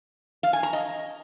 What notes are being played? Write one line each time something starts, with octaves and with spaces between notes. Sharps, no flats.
F5
G#5
A#5
D#5